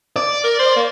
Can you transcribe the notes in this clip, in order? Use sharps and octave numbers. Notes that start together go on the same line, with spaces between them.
D5
A#4
C5
A#3